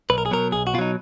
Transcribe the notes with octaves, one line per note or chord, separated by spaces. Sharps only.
B1 B4
A#4
G#4
B2 F#3 A#4
B1 G#4
F#4
B2 F#3 D#4 F4